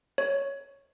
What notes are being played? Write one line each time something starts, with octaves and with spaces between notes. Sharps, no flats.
C#5